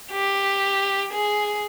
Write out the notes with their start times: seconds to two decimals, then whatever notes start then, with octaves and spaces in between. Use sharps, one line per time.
0.12 G4
1.12 G#4